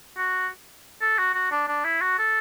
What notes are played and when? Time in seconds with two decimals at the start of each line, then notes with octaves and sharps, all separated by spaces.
0.17 F#4
1.01 A4
1.18 F#4
1.35 F#4
1.52 D4
1.68 D4
1.84 E4
2.01 F#4
2.19 A4